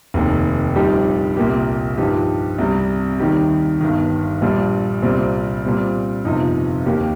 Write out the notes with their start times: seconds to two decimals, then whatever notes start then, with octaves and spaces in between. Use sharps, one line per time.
0.14 F1 D#2 D#3
0.76 A#1 A#2 G3 D#4 G4
1.36 C2 A#2 A#3 G4
1.98 G2 F3 D#4 G4
2.58 C2 C3 G3
3.20 D#2 D#3 G3 D#4 G4
3.81 G1 G2 D#3
4.41 A#1 A#2 G3
5.02 C2 A#2 G3 C4
5.64 A#2 G3 C4
6.25 G1 F2 C3 F3 D#4
6.86 D#2 D#3 A#3 D#4 G4